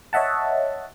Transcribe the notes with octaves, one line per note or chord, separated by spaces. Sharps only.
C#5 D#5 E5 F#5 A5